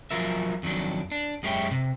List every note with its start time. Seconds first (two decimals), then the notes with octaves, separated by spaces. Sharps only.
0.11 F3 F#3 F4 A#4 E5
0.63 F2 D#3 F#3 D4
1.12 D4
1.43 F#2 G#3 G4 C#5 E5 G5
1.71 C3